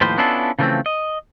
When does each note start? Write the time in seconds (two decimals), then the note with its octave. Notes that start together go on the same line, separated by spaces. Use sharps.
0.01 D#2 A2 F3 B4 C5
0.18 B3 C#4 D4 E4 F4 A4
0.59 C#3 E3 F3 G#3 A3 C4
0.86 D#5